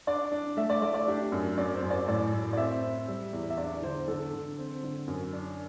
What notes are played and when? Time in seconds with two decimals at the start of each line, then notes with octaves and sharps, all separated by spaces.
0.07 D4 D5
0.32 D4
0.57 A3 E5
0.70 D5
0.82 A3 D5
0.94 D5
1.08 D4 G4
1.32 F#2
1.58 F#2 D5
1.74 C5
1.83 F#2
1.90 D5
2.07 A2 D5
2.32 A2
2.53 D5
2.57 C4 E5
2.83 C4
3.08 G3
3.33 E2
3.50 E5
3.58 D4 D5
3.82 D3 C5
4.08 D3 A4
4.33 D3
4.58 C4
4.83 D3
5.08 F#2
5.33 D4